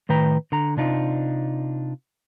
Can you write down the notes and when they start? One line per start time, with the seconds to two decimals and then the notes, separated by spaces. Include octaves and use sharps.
0.09 A2 D#3 B4 G5 A#5
0.52 D3 A#5
0.77 C3 D4 D#4 F4